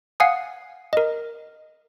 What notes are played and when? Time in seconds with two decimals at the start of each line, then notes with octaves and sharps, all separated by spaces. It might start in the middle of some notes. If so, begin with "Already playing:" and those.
0.20 F5 F#5 G#5 D#6
0.93 A#4 D#5